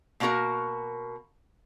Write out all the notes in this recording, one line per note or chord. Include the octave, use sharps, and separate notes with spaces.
B2 A#3 D4 F#4 A#4 A#5